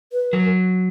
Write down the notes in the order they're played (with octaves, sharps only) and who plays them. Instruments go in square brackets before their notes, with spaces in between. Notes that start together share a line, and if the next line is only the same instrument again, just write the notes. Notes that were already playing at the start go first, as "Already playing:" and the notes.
[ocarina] B4
[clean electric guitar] F#3 [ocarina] A#4